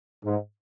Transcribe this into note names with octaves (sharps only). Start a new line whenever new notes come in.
G#2